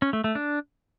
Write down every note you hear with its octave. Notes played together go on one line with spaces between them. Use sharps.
C#4
A3
A3
D4